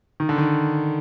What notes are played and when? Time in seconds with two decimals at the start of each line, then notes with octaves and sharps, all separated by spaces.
0.20 D#3
0.29 D3
0.38 D#3